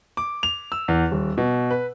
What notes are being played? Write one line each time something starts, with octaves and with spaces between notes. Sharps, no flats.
D6
F7
E6
E2
D#1
B2
B4